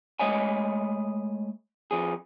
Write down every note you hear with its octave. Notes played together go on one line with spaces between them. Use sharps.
G#3 A3 C#5 D#5 E5 G#5
F2 F3 G#4